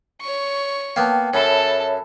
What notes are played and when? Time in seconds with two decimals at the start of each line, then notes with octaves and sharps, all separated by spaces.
0.21 C#5 C#6
0.96 A#3 B3 G5 A5
1.34 F#2 A4 C#5 E5 A5 B5